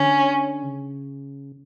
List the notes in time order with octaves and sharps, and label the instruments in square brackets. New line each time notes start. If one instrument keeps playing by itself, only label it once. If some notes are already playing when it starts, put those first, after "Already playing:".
Already playing: [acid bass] D3 [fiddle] C#4
[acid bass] C#3